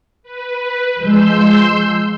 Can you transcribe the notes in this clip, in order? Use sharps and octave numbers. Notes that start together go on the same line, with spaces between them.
B4
F3 G#3 C6 E6 G6